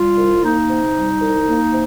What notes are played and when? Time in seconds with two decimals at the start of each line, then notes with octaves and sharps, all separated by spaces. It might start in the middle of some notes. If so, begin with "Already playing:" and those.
Already playing: G3 F4
0.17 C2
0.43 A#3 D#4
0.69 C3
0.95 G3
1.20 C2
1.46 A#3
1.71 C3